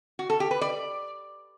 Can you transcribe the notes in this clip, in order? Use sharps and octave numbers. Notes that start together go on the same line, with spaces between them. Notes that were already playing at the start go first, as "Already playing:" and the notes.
F#4
A4
G4
B4
D5